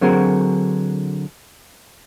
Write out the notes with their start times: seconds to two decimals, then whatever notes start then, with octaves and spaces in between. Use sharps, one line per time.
0.01 D3 F#3 C4 F#4 G#4 A#4